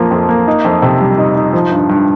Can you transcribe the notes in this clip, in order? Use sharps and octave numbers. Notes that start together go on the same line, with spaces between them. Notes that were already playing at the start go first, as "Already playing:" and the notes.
Already playing: F2 F3 A#3
F2
A#3
D#4
F2
C3
G3
D#4
D#4
F3
G2
G2